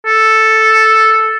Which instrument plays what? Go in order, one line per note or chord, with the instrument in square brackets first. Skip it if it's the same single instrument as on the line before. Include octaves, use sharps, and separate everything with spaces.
[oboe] A4